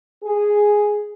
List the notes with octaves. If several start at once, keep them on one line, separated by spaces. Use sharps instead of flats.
G#4